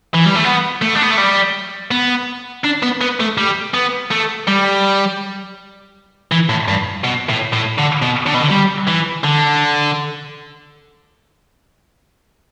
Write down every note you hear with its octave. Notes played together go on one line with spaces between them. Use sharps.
E3
G3
A3
B3
A3
D4
B3
A3
G3
B3
D4
B3
B3
A3
G3
B3
A3
G3
E3
A2
G2
B2
A2
A2
D3
B2
D3
B2
D3
G3
E3
D3